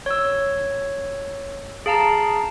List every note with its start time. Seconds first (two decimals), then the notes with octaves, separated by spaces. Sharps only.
0.06 C#5 E6
1.86 G#4 F5 A5 A#5